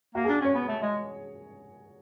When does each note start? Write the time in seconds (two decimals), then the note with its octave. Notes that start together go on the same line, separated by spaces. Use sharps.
0.15 A#3 F#4
0.25 G#4
0.28 D4
0.41 C#4 C#5
0.55 B3
0.68 A3
0.82 G#3